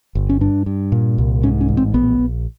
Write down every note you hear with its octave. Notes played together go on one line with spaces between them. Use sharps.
G1
C#4
G2 D4
G2
A#2
C2
G#2 C#4
C#4
A1
C4
A#1 B3
A#1